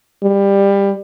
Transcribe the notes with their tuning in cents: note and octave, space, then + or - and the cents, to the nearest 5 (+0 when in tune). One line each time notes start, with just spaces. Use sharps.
G3 +20